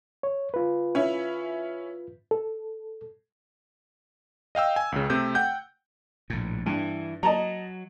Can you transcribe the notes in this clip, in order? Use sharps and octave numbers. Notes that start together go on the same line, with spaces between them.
C#5
F4 B4
C#4 E4
A4
D#5 F5 G5 E6
G#5
C#2 C#3
C3 A3 G6
F#5 G5 G6
A#1 A2
G2 E3
F#3 D#5 A5 A#5